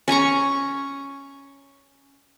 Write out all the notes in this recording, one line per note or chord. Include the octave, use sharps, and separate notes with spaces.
C#4 G#5 A#5 C#6